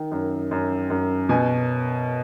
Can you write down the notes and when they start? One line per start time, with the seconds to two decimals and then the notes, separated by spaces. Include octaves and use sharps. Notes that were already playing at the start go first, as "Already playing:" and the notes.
Already playing: D#3
0.12 F#2
0.51 F#2
0.90 F#2
1.29 B2 G#5